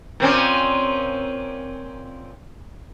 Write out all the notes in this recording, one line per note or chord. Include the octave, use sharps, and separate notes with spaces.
A#2 C4 C#4